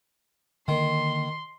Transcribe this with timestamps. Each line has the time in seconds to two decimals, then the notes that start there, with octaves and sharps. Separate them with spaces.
0.68 D3 D#3 A#3 C6